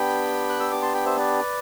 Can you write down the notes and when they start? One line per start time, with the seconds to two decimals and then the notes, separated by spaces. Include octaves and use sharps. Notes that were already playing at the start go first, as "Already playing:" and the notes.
Already playing: B3 D4 G4 G5 B5
0.49 F#6
0.60 E6
0.71 D6
0.82 A5 C6
0.94 G5 B5
1.06 C5 E5
1.18 B4 D5